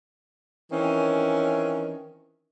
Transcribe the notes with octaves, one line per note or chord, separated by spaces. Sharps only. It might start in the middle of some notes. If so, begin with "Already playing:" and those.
D#3 E3 C4 C#4